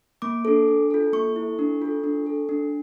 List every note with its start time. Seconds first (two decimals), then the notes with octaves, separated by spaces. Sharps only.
0.22 A#3 D6
0.45 D4 A4
0.68 D4
0.90 F4 A4
1.13 A#3 C#6
1.36 E4 A4
1.59 D4
1.82 F4 A4
2.04 D4
2.26 A4
2.49 D4